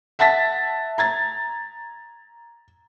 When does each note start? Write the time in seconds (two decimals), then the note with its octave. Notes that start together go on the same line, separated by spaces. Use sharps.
0.19 E5 F#5 A5 A6 B6
0.98 A#5 G#6 A6